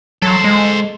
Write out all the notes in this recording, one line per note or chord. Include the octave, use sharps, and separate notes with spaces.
F#3 A4 C5
G#3